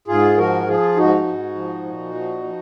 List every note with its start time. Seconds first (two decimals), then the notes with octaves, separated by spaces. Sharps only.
0.08 G#2 F4 G#4
0.38 F3 F#4 A#4
0.67 F3 F4 G#4
0.97 G#2 D#4 F#4
1.26 G#2
1.55 F3
1.85 A#2
2.14 F3
2.44 F3